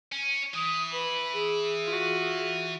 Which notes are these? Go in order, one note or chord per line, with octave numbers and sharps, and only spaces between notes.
C#4
E3 D#6
B4 B5
G#4
F4 F#4